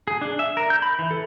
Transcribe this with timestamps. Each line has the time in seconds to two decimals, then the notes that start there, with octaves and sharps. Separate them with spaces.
0.08 G#4
0.21 D4
0.39 E5
0.57 A#4
0.70 G6
0.82 B5
0.99 E3
1.11 A4